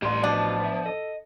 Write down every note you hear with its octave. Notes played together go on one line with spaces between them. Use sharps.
A1 G3 C6
F3 B3 D4 F#4 D#5
B3 E5
A4 D#5